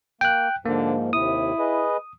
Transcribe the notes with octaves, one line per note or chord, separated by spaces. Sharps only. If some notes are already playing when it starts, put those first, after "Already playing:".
A#3 G5 F#6
G#2 D3 F3 A#3
D#2 C3 E4 D#6
G#4 B4 D#5